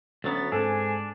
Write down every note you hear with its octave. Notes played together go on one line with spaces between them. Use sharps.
D2 F#3 B3 C#4 A6
G#2 C4 D4 A4 G#5